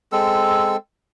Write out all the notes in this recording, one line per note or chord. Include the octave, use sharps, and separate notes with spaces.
G#3 C4 A4 E6